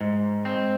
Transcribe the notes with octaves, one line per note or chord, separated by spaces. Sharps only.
G#2
C4